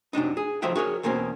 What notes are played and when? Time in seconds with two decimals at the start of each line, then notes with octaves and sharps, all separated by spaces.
0.13 F#2 C3 D4 D#4
0.37 G#4
0.62 D3 F3 F#3 D#5 E5 G5
0.76 F#4 G#4 A#4 C#5
1.03 E2 B2 A#3 C4 C#4